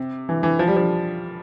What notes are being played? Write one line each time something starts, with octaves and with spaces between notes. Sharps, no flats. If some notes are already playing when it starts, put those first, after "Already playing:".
Already playing: C3
E3
E3
F3
G3
F3